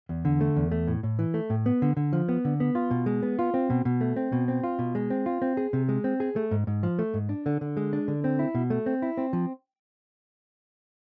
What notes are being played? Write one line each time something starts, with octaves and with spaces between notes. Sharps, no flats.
E2
D3
A3
E2
A3
A2
A2
E3
A3
A2
B3
D3
D3
F3
B3
D3
B3
F4
B2
G#3
B3
F4
C4
B2
B2
A3
C4
B2
C4
F4
B2
G#3
C4
F4
C4
G#4
C3
G#3
C4
G#4
A3
G#2
G#2
F3
A3
G#2
D4
D3
D3
G#3
D4
D3
C4
E4
B2
A3
C4
E4
C4
F3